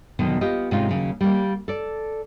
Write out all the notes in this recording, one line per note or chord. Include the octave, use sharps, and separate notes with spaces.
E2 B2 D3 D#3 F#3
B3 F4 G4 D#5
G#2 C3 G#3 C#4 D#4 F4
D#2 C#3 F#3
G3 A#3
A4 D5